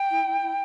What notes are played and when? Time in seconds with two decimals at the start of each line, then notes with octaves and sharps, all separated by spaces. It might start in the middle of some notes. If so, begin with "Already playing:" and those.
Already playing: G5
0.10 E4
0.25 E4
0.42 E4